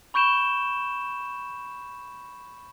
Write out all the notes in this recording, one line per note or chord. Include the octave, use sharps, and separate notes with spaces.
B5 C#6 G6 D7 E7 G7